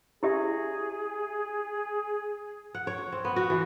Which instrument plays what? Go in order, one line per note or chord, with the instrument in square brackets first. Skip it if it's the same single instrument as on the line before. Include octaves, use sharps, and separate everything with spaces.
[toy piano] E4 G4 E5 [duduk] G#4
[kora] F#5
C#5
C4
B3
F#4
E3